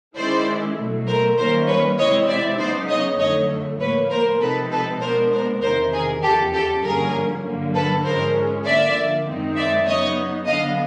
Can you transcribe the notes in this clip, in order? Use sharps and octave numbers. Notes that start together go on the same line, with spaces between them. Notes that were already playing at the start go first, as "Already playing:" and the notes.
D#3 G#3 C#4 E4 C5 D5
B2 F#3 A3
A#4 C5
D#3 G3 A#3 C#4 A#4 C5
B4 C#5
C3 E3 G#3 C4 E4 C#5 D#5
D5 E5
C#3 F#3 B3 D#4 C5 D5
C#5 D#5
F2 D3 F#3 A3 C#5 D#5
A2 F3 A#3 B4 C#5
A#4 C5
C3 F3 G#3 C4 D#4 A4 B4
A4 B4
B2 G#3 B3 D4 A#4 C5
A#4 C5
E2 C3 D#3 A#4 C5
G#4 A#4
E2 C#3 F3 G4 A4
G4 A4
G2 D3 F3 A#3 C#4 G#4 A#4
G2 D3 F#3 A#3
A4 B4
G#2 F3 G#3 C#4 A#4 C5
D3 F3 A#3 D5 E5
F#2 D#3 G#3 C4 D#4
D5 E5
C#3 F#3 B3 D#4 C#5 D#5
D3 F#3 B3 D4 D#5 F5